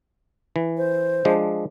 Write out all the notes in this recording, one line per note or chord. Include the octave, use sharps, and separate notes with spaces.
E3
C5
F3 G#3 D4